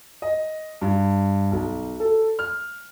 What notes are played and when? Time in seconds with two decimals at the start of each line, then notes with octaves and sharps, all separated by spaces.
0.22 D#5
0.82 G2
1.51 B1
2.00 A4
2.39 F6